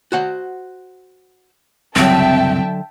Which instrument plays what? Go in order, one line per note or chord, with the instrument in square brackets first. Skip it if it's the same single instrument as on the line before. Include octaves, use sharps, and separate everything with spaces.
[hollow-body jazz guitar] F#4 C5 F#5
[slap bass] F#1 C2 [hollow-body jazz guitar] D3 F#3 [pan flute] C4 [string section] E5 G5 A5